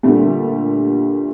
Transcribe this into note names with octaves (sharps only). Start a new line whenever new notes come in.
A#2 D3 G3 A3